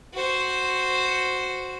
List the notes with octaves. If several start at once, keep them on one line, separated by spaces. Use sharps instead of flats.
F#4 C5